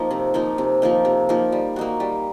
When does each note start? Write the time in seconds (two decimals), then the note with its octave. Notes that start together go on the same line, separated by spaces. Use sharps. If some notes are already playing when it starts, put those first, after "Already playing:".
Already playing: F3 A#3 D#4
0.11 C3
0.34 F3 A#3 D#4
0.58 C3
0.82 F3 A#3 D#4
1.05 C3
1.29 F3 A#3 D#4
1.52 G3
1.76 A#3 D#4 F#4
2.00 G3